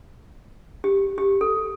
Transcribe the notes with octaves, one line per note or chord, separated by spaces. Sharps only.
G4
G4
A4